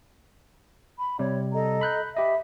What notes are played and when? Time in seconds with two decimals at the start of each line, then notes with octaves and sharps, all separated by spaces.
0.98 B5
1.19 C3 G3 C#5
1.52 A4 D#5 A#5
1.81 B5 F#6 G6
2.17 G4 D#5 E5 B5